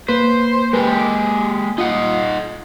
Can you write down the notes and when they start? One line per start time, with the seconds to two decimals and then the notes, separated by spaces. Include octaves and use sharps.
0.09 A#3 B4 C5 B6
0.73 G#3 G4 A#4 B4
0.99 D6
1.78 D#4 F4 F#5